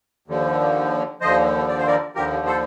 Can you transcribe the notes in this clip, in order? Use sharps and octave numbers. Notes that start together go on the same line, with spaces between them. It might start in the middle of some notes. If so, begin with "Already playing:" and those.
D#2 D3 F3
D#2 D3 F3 C5 D#5
D5
C5
A#4 D5
D#2 D3 F3 G4 A#4
A4 C5